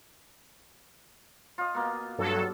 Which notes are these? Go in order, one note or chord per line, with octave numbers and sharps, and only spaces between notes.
F4 D#5
B2 A#3
G2 F#3 A4